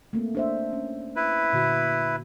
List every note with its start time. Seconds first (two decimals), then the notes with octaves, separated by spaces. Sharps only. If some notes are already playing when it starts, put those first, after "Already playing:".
0.13 A3 A#3 C4
0.35 D4 C5 E5
0.73 C#4
1.16 E4 B4
1.53 A#2 D3 F#4